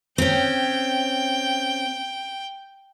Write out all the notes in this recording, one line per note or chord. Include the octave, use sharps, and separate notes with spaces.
C4 C#4 G5